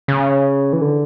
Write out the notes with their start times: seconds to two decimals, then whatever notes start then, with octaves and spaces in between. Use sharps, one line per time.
0.08 C#3
0.73 E3
0.81 D3